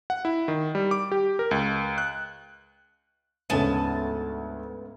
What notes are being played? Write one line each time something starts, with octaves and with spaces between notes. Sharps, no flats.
F#5
E4
D#3
G3
D6
G4
A#4
C#2
F#6
D2 G#2 C#3 B3 C#4 G#5 A5